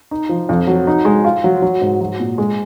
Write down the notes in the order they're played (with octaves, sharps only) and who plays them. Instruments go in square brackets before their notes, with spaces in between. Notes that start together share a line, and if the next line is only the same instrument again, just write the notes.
[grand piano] D#4
F3
F2
F#3
D#4
G#3
F4
F#3
F#3
G#2
F#3
A#2
G#3